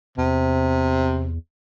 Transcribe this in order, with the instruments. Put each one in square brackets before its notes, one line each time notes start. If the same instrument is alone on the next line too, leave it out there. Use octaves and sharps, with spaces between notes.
[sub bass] E2 [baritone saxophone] C3